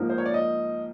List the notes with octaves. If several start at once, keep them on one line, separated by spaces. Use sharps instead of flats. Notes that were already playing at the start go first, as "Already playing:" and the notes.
Already playing: G#2 F3 A#3 D#4
C5
C#5
D5
D#5